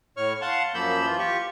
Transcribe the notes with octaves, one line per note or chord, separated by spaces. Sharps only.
A2 C#5 C#6 F6
F5 F#5 A5 C6
F#2 F3 A#3 B5 E6 G6
E3 F4
F4 G4 C#6